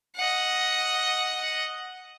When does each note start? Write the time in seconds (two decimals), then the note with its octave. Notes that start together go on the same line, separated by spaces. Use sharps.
0.16 D#5 F#5